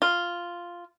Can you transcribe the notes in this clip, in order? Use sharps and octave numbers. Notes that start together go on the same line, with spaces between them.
F4